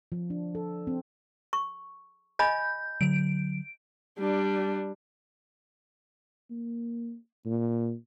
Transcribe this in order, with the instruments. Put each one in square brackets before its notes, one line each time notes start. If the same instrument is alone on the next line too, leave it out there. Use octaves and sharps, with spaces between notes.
[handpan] F3
D4
A4
C4
[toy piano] C#6
[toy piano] D#5 G#5 B5 [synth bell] G6
[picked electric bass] D3 F#3 [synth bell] D7
[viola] G3 D4
[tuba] A#3
A#2